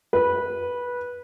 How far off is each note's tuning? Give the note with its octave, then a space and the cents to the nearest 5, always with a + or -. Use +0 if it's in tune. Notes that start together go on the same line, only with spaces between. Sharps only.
B4 -15